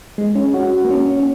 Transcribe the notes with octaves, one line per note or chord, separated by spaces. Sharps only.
G#3
C#4
F#4
A#3
C#4
C#4